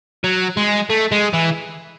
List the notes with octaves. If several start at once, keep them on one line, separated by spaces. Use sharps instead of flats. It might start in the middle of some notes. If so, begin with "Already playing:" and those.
F#3
G#3
A3
G#3
E3